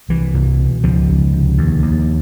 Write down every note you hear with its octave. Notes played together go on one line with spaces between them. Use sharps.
C2 E3
C2
B2
C#2 F3
C#2
C3
D#2
D#2